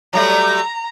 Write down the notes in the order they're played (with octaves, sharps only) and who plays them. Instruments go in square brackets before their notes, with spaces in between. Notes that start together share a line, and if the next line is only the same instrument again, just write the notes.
[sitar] F#3 G3 A3 [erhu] A#5